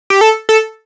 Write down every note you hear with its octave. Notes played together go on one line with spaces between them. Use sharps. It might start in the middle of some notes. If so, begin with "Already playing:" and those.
G4
A4
A4